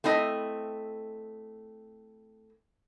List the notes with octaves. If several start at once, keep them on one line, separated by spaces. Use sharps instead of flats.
A3 C4 E4 D#5